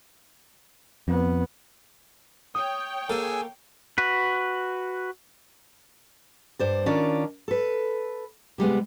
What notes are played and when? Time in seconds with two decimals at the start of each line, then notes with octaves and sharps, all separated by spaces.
1.08 F2 B3
2.55 C#5 G5 D#6
3.10 A#3 G#4 A4 G#5 E6
3.98 F#4 B4
6.59 G2 C5 D5
6.86 D#3 C#4 D4 F4 D5
7.48 A4 B4
8.58 C3 G3 G#3 B3